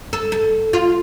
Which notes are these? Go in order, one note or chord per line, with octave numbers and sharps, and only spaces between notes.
A4
A4
F4